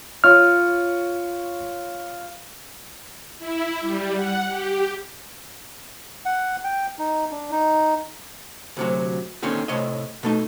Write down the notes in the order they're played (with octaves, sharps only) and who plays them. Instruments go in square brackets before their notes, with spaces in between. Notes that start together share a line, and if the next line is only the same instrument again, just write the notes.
[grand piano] F4 C#5 [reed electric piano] F6
[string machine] E4
G3
F#5
G4
[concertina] F#5
G5
D#4
D4
D#4
[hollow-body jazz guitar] D2 C3 F#3
A#2 D3 D#3 C4 C#4
A2 C3 C#5 D#5
B2 A3 D#4